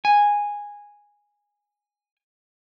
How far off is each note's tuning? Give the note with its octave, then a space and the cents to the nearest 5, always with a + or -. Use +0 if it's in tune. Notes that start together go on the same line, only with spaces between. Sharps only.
G#5 -10